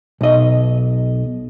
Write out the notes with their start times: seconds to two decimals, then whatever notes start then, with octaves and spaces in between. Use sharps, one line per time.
0.21 B1 D#5